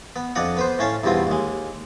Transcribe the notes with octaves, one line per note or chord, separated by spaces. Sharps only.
B3
F2 D4 D#5 F#5
B3 B4 C5
A2 C#4 F5 A5
E2 G2 B2 C4 F4
D#2 G#3